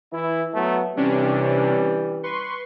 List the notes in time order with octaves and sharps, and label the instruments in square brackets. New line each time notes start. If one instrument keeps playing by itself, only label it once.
[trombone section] E3 E4
F#3 A3 B3
[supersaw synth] C3 C#4 D4 [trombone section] E3 G3
[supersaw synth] B4 C6 C#6